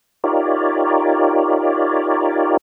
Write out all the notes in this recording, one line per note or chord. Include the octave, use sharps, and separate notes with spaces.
D#4 F4 G4 A#4 C#5 D5